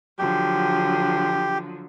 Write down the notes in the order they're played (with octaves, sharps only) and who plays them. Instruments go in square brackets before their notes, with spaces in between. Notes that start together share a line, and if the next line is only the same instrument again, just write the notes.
[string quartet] D3 F3 F#3 [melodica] G4